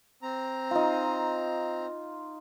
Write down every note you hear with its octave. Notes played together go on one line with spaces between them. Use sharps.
C4 A#5
D#4 F4